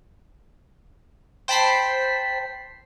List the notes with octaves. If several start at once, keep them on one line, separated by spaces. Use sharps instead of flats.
C5 G5 A5 B5 B6 C7